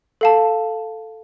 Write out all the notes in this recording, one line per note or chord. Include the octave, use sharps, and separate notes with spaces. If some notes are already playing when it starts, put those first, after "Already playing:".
A4 F5 A5